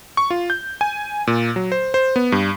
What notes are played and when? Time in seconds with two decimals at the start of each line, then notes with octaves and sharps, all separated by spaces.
0.17 C#6
0.30 F4
0.50 G6
0.81 G#5
1.27 A#2
1.56 F#3
1.72 C5
1.94 C5
2.16 B3
2.32 G2